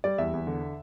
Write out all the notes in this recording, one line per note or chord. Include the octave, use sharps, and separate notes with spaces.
G3 D5
E2 E5
E2
D3